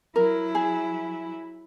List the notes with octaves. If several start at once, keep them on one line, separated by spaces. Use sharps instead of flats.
F#3 E4 A#4
G#4